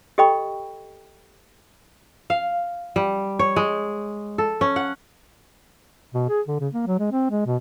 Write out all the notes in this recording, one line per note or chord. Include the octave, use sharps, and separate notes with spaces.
G4 A4 D#5 G5 B5 C#6
F5
G3
C#5
G#3
A4
C#4
F#5
B2
G#4
D3
C#3
A#3
F#3
G#3
C4
G#3
B2